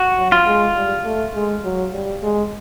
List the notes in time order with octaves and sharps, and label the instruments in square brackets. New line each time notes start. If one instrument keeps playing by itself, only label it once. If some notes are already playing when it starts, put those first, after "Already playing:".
Already playing: [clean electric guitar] F#4
[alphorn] F#3
[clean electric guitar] F4
[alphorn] G#3
G3
A3
G#3
F#3
G3
G#3